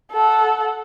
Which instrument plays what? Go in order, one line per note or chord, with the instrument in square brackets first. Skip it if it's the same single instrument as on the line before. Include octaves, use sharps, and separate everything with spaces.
[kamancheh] A4 F#5